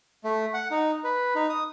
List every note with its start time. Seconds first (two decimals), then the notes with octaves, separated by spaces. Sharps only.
0.24 A3
0.54 F#5
0.71 D#4
1.04 B4
1.35 D#4
1.49 D#6